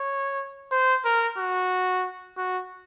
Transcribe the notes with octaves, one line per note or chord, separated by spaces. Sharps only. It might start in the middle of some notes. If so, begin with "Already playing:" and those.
Already playing: C#5
C5
A#4
F#4
F#4